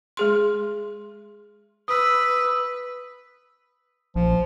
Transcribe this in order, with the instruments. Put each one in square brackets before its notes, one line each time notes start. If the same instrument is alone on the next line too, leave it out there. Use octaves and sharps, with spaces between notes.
[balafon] G#3 G#4 C6
[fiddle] B4 [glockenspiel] D#6 E6
[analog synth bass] A#1 [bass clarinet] F3